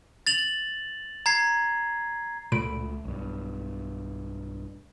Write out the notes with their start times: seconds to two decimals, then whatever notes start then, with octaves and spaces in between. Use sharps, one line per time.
0.27 A6 F7 F#7
1.26 A#5 G#6 C7
2.52 C#2 A#2 A3 B5 D7
3.04 B1 G2